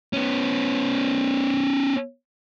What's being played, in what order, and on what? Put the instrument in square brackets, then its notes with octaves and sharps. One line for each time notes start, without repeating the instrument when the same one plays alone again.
[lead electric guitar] B3 C#4